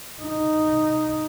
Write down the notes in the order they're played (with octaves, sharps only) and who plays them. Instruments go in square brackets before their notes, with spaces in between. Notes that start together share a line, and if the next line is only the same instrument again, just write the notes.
[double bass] D#4